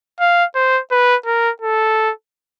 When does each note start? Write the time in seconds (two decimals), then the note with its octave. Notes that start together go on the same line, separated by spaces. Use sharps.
0.20 F5
0.55 C5
0.91 B4
1.26 A#4
1.62 A4